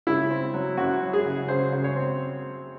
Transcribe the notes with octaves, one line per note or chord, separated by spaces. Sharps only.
C#3 E4
C4
F#3
F#2 F#4
F#3
G#4
C#3
C#3 C5
C#3
C#5
C4